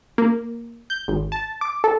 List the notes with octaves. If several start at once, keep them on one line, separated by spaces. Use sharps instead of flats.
A#3
G6
G#1
A5
D6
A4